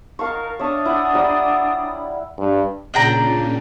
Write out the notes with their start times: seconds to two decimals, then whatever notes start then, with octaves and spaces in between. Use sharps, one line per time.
0.19 D#4 A#4 F5 A5 C#6
0.59 D4 C#5 E5 A5 D#6
0.86 E4 F#5
1.13 G3 F#5 A#5
2.39 G2
2.94 A#2 C#3 D4 G5 A#5